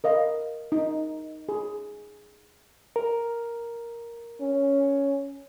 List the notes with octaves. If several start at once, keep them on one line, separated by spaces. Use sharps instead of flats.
A#4 D#5 F5
D#4
G#4
A#4
C#4